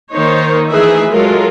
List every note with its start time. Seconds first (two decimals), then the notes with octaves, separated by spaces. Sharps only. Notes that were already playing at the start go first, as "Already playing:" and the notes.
0.12 D#3 A#3 D#4 C5 C#5
0.69 E3 A3 D#4 G#4 B4 E5
1.10 F#3 G#3 F4 A4 A#4